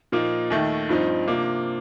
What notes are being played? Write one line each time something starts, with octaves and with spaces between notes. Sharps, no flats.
A#2 F3 A#3 D#4
D#2 D#3 A3
G2 F3 C4 D#4
C3 F3 A#3 D4